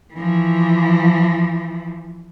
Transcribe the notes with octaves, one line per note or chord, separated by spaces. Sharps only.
E3 F3